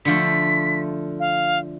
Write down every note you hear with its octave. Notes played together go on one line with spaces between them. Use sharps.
D3 F3 A3 B6
F5